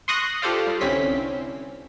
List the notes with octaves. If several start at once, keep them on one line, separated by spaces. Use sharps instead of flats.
C6 C#6 D#6 F#6 A#6
F4 G4 A4 C5 D5 F5
G3
C2 D3 C4 C#4 E4 B6